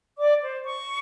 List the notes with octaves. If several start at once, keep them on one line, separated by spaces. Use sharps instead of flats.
D5 D6
C5
C#6